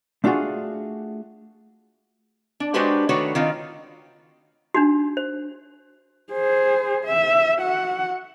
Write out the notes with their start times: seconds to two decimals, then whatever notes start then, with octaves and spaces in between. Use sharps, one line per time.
0.24 A3 D4 F4 F#4 G#4
2.60 D4
2.74 G#3 D4 F#4 G4 B4 C5
3.09 D#3 A3 D4 F#4 B4 C#5
3.35 D#3 C4 D#4 F4
4.74 D4 D#4 F#4
5.17 C5
6.33 G#4 C5
7.05 E5
7.57 F#4 F#5